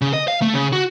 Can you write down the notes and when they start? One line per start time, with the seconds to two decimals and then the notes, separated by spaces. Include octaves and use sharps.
0.01 C#3
0.13 D#5
0.28 F5
0.42 A3
0.54 C#3
0.73 F#4